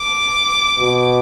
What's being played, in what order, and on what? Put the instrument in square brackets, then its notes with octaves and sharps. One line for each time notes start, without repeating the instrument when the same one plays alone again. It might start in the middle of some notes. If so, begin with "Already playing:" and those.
Already playing: [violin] D6
[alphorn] B2